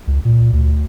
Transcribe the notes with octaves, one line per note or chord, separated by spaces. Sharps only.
C#2
A#2
D2